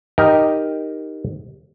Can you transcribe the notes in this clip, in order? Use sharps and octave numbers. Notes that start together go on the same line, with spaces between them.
D#4 G4 A#4 D#5